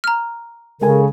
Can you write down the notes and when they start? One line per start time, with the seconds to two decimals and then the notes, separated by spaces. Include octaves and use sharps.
0.04 A#5 F6
0.81 C#3 G#3 A4 A#4 G#5